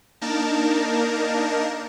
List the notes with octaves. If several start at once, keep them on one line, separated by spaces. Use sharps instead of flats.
A#3 D4 D#4 A#4 A5